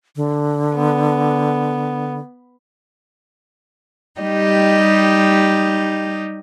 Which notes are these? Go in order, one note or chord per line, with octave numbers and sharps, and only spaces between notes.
D3
B3
G3 D#4 G4 D#5